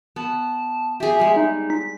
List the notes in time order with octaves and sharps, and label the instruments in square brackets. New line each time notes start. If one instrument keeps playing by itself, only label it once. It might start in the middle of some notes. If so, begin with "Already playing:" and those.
[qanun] B3 [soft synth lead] A5
[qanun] G4 G#4 [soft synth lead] E5
[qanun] G3 G#3
[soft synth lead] D#4
B6